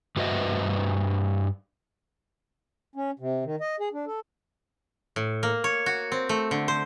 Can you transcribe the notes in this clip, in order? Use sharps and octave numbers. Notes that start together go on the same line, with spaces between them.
G2 F#4 B4 C5 D#5 E5
C#4
C3
D#3
D#5
G#4
D4
A4
A2
A#3
C#5
F#4
C4
A3
D3
C5